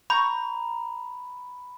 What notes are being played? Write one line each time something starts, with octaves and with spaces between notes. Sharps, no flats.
A#5 B5 C#6 G6